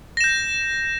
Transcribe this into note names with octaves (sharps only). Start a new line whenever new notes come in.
G6 A#6 E7